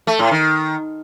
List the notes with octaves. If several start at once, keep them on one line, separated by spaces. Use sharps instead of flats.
A3
A2
D#3